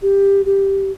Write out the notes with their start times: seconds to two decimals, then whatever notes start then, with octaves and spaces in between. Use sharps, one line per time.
0.02 G4
0.46 G4